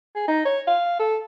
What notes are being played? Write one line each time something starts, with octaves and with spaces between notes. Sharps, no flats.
G#4
D#4
C#5
F5
A4